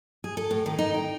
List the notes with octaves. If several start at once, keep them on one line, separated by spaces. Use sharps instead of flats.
G#4
A4
A2
D#3
D#4
G5